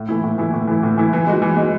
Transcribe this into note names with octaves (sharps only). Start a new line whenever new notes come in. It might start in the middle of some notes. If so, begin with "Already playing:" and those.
Already playing: A2
E3 A3 E4
A2
E3 A3 E4
A2
E3 A3 E4
A2
E3 A3 E4
E3
G#3 D#4 F#4
E3
G#3 D#4 F#4